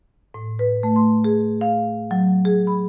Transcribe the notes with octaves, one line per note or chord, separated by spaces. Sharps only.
A2
B4
A3
C6
G#4
F5
F#3
G#4
B5